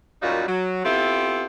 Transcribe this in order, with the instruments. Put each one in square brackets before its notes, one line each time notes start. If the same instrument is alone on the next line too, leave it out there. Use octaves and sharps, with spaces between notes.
[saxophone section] F#2 A#2 G3 D#4 F4 F#4
F#3
B3 C4 E4 F4 G4 A4